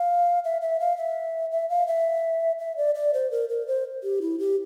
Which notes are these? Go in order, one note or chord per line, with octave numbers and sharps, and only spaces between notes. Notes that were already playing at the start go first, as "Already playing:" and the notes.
Already playing: F5
E5
E5
F5
E5
E5
F5
E5
E5
D5
D5
C5
A#4
A#4
C5
G4
E4
G4